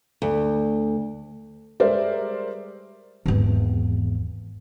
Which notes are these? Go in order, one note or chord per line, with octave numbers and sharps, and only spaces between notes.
D2
G3 G#3 A#4 C5 D5 E5
G#1 E2